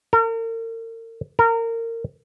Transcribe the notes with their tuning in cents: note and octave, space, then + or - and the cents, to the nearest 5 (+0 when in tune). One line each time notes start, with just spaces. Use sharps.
A#4 -40
A#4 -25